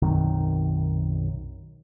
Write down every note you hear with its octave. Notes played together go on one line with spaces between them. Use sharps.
B1 F#2 C3 D#3